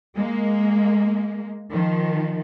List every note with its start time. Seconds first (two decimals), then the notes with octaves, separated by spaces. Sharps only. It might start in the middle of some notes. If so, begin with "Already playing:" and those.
0.16 G#3 A#3
1.72 D#3 F3